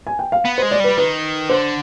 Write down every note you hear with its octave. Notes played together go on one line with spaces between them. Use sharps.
G#5
G5
F5
B3
G#3 C5
D5
G3 B4
D#3 B4
D3 C5